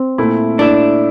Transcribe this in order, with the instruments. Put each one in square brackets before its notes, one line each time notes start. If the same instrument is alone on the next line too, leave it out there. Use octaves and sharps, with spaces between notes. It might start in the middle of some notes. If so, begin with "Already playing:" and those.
Already playing: [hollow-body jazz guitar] C4
[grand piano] A#2 A3 E4
[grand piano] A#2 A3 E4 [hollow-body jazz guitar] D4